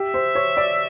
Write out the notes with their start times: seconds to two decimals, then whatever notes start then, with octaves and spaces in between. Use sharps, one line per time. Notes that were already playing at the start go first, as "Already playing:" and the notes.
Already playing: G4 E5
0.14 C5
0.35 C#5
0.57 D5